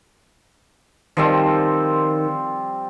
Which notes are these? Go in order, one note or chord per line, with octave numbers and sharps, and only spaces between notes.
D#3 F3 G3 C4